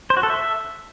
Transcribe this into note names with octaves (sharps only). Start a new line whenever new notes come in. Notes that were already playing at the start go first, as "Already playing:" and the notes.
C5
F#4
A4
E5